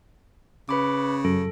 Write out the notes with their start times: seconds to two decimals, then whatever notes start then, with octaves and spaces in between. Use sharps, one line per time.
0.69 C#3 B4 B5 D6
1.25 F#2 A4